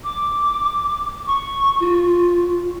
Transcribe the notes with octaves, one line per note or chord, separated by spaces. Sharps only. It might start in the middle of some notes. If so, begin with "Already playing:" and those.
D6
C#6
F4